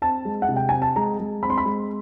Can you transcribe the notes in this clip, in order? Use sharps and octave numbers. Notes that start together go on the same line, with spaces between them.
C4 A5
G#3
F#5
C3
G5
C4 G#5
A5
G#3 A#5
G#3
C4 B5
C6
B5
G#3